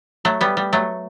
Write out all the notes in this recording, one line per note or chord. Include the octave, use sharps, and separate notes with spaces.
F#3 A3
G3 B3
G3
F#3 A3